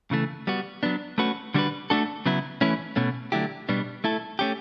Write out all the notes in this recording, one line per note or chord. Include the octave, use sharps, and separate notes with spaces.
C#3 E3 A3
G3 B3 F#4
F#3 B3 D4
A3 C#4 F#4 B4
D3 G3 D4 F#4 B4
A3 D4 F#4 A4
C#3 F#3 B3 E4
E3 A3 C#4 E4 B4
B2 A3 C#4
D3 F#3 A3 E4 G4
B2 G3 B3 D4
A3 E4 A4
A3 C#4 G4